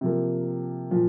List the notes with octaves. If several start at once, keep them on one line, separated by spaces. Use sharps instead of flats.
C3 F3 A#3
A#2 F3